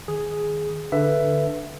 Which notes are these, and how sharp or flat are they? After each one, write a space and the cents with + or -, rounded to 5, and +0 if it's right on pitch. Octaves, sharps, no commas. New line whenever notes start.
D#3 +0 G#4 +0
D3 +0 B4 +0 E5 +10